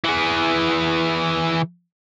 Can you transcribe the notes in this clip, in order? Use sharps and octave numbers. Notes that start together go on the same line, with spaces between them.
E3 G#4